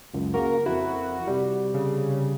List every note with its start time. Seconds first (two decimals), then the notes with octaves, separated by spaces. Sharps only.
0.14 C#2 F#2
0.34 C#3 A#3 F#4 A#4
0.66 F2 E4 F#4
1.27 C3 G3
1.74 C#3